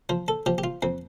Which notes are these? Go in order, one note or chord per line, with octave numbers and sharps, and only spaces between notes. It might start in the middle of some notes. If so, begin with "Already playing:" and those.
F3 C5
A4
F3 G4
G4
F4
F2 C4